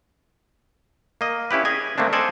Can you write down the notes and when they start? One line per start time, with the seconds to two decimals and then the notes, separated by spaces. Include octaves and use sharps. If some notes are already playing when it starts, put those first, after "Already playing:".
1.21 A#3 D#5
1.51 C#4 E4 G4 B4
1.65 G#4 D#5 G#5
1.98 A3 A#3 C4 D4
2.13 A4 C5 D5 D#5 G#5